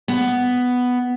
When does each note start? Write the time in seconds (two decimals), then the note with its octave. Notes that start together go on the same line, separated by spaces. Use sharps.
0.08 B3